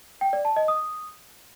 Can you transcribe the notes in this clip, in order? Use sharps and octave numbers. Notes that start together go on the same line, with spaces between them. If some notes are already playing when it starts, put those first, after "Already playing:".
G5
D5
A5
D#5
D#6